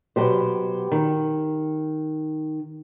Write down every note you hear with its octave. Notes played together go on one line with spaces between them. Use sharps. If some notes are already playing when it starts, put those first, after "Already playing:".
B2 F#3 G4 C5
D#3